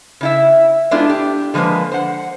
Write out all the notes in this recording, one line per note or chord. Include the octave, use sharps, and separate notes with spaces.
C#3 E4 E5
G#3 A3 B3 D4 E4 F4
G4
D3 F3 G#3 A#3 B4
C5 F#5